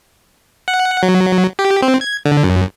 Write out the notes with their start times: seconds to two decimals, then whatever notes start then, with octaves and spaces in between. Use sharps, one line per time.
0.68 F#5
1.03 F#3
1.59 G4
1.82 C4
2.01 G#6
2.25 D3
2.44 F#2